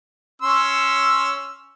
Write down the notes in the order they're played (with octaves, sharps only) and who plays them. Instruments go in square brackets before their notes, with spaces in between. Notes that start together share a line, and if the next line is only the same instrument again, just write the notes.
[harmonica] C#4 C6 E6